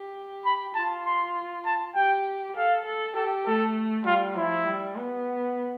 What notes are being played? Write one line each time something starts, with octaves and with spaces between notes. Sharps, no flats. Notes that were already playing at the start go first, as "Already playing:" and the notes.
Already playing: G4
B5
F4 A5
C6
A5
G4 G5
A4 F5
A4
G4 A4
A3 A4
G3 F4
F3 E4
G3
B3